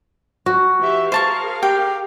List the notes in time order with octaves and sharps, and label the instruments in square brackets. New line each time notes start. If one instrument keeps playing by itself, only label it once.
[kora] F#4
[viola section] E3 G4 E5
[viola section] G#4 A#4 F5 [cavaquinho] C5 A5 C#6
[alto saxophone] G4 [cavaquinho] G5